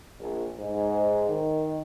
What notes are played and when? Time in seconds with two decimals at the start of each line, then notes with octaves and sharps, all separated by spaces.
0.20 A#1
0.59 G#2
1.29 D#3